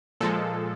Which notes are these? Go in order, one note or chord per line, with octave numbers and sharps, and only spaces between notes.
A#2 F3 G#3 A4